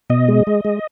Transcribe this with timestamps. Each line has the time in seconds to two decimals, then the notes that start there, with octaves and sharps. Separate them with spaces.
0.10 B2 D#5
0.28 G#3
0.47 G#3
0.65 G#3